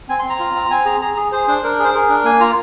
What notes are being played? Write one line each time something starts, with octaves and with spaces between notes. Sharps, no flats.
C4 G#5
C6
C4
A#5
F4
C4
C4 G#5
G#4 A#5
G#4 A#5
G#4
G#4 C5
D4 C5
D4 A#4
G#4 C5
G#4 A#4
D4
A#3 G#5
F4 A#5